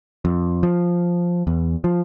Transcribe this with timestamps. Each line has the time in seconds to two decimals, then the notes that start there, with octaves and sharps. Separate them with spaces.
0.25 F2
0.63 F3
1.47 E2
1.84 F3